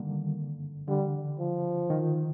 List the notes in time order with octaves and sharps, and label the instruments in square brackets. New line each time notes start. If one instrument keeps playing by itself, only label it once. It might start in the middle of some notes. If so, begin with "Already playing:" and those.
Already playing: [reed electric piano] D3 D#3 G3 A#3
[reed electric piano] D3 [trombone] G3
[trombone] F3
[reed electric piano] D#3